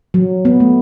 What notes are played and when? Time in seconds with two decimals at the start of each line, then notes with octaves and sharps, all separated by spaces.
0.14 F#3
0.45 B3
0.60 A3